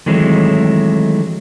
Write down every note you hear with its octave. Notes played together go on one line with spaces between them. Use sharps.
D#3 E3 F#3 G#3 A3 C4